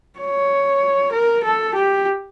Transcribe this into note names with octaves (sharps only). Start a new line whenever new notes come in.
C#5
A#4
A4
G4